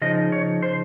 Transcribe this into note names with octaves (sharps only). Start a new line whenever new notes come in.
C#3 F3 D#4 D#5
C#5
C5